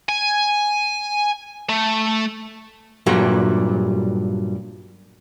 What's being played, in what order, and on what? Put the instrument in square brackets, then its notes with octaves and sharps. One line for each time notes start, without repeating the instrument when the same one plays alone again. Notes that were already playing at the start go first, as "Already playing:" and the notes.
[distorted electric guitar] G#5
A3
[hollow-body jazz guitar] G2 A#2 F#3 G3 A3